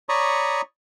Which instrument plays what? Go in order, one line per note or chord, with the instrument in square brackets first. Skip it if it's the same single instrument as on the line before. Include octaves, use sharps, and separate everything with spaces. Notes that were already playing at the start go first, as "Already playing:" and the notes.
[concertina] C#5 D5 A#5 B5 C#6 D#6